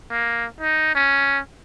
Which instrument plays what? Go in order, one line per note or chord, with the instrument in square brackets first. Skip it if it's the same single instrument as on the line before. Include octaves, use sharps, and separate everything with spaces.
[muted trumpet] A#3
D#4
C#4